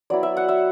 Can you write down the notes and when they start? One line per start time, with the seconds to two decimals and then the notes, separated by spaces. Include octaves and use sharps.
0.10 F#3 B3 E4 D5
0.23 E5
0.37 F#5
0.49 E5